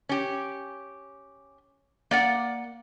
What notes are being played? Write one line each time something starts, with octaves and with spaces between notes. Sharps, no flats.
C#4 G4
A#3 D5 F#5